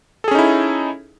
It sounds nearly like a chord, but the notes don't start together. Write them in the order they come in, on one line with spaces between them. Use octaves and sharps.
A4 G#4 C#4 D#4 E4